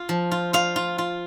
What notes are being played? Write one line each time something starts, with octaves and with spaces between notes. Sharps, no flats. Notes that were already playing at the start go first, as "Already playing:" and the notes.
Already playing: F4
F3
F4
F4 F5
F4
F4